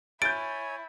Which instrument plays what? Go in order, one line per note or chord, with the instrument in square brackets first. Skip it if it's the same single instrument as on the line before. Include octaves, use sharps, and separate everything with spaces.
[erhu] E4 [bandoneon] C#5 G#5 [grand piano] G6 A6 [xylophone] D7